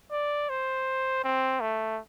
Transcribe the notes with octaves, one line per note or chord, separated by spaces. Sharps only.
D5
C5
C4
A3